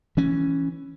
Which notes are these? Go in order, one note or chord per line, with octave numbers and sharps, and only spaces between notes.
E3 C#4